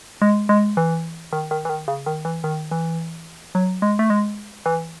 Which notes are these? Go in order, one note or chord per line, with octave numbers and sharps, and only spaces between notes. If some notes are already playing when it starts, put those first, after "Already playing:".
G#3
G#3
E3
D#3
D#3
E3
D#3
C#3
D#3
E3
D#3
E3
F#3
G#3
A3
G#3
E3